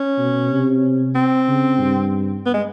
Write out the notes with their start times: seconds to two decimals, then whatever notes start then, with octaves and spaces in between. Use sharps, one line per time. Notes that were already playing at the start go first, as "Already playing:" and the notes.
Already playing: C#4
0.18 B2
0.51 C3
1.16 C4
1.48 C#3
1.80 G2
2.46 B3
2.54 G#3